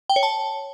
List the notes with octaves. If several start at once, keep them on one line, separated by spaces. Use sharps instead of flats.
G5
C#5
A5